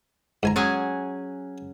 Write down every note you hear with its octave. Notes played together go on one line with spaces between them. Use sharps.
G#2 G#5 A#5
F#3 C#4 G#4